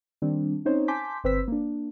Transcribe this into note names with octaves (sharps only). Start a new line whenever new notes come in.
D#3 G3 C4 D4
C4 C#4 D#4 C5 C#5
G#5 A5 C6 D6 G6 B6
G1 C4 B4 C5 E6 B6
A#3 D4